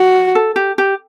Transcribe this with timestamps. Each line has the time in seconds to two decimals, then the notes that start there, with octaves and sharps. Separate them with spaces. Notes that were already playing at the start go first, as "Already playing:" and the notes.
Already playing: F#4
0.35 A4
0.56 G4
0.78 G4